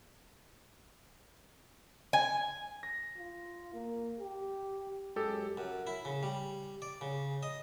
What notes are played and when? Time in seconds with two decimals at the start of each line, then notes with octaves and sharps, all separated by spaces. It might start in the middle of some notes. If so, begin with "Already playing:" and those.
2.13 G#5
2.83 A#6
3.17 F4
3.74 A#3
4.20 G4
5.16 F#2 G#3 G4 A4
5.57 F#2
5.87 E4
6.05 C#3
6.23 G3
6.82 D5
7.01 C#3
7.43 D#5